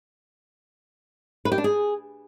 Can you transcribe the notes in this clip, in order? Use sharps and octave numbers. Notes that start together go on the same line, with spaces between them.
B4
G4
D4
G#4